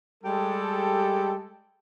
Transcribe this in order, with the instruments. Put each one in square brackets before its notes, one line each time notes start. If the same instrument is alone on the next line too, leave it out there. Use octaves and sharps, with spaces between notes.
[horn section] G3 G#3 G4 A4